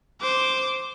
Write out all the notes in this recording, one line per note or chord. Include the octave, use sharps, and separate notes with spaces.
C5 D6